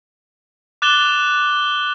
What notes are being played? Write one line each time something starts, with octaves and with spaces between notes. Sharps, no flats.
D6 F#6 A6 E7 F7 G7